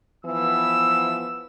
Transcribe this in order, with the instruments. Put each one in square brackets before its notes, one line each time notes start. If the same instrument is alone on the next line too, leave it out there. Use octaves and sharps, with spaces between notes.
[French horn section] E3 F3 B3 [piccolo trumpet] E6